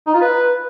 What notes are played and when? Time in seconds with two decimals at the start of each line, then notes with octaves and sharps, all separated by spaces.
0.07 D#4
0.14 F4
0.21 B4